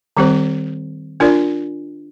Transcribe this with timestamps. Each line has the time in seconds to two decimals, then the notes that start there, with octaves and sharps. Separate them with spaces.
0.17 D#3 G3 C4 G4 C5
1.20 D4 F4 A#4 D5